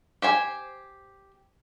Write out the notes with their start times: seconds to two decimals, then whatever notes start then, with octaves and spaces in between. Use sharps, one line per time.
0.22 G4 C5 G#5